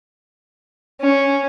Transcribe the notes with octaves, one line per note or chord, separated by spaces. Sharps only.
C#4